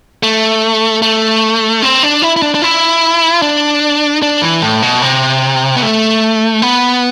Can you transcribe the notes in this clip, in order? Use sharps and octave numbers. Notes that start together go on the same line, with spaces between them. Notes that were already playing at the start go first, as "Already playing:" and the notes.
A3
A3
C4
D4
E4
E4
D4
D4
E4
D4
D4
E3
A2
B2
C3
B3
A3
B3